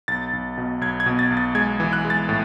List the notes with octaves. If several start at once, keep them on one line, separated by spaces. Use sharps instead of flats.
B1 A6
B1
B2
B1 G#6
G#6
B2
A6
B1
A6
G#3 G#6
E3
F#6
G#3
A6
A2